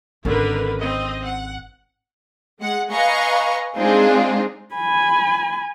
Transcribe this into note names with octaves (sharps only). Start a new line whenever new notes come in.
G#1 D3 C#4 A#4 B4
C4 D#5
F#5
G#3 F#5
B4 D#5 F5 G#5 A#5 C#6
G#3 C4 D4 D#4 F4 G#4
G#5 B5